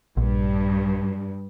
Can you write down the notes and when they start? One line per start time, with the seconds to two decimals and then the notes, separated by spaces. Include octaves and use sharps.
0.17 A#1 G2